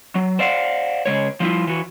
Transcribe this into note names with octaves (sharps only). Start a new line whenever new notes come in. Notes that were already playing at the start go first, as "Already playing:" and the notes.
F#3
C5 D5 F5 F#5
C#3 G#3 C#5
F3 G3 E4 F4
E3 F#4